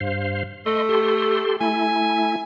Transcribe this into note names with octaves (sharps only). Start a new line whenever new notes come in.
G2 C5 F5
A3 D#5 C6
G4 A4 C6
A3 E4 G#5